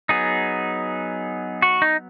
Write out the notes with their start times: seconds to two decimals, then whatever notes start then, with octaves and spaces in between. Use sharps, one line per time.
0.09 F#3 B3 D#4 G#4
1.62 F#4
1.82 D#4